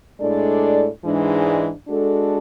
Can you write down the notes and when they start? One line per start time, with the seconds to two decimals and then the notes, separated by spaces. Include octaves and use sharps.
0.20 A2 G#3 D4 A4 D5
1.04 G#2 E3 G#3 D4
1.88 G#3 D4 F#4 A4